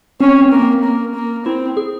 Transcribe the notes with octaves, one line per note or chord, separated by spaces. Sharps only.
C4 C#4
C4
A#3
C4
A#3
A#3
C4 E4
G#4